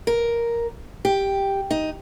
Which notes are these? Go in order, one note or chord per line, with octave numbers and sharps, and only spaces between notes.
A#4
G4
D#4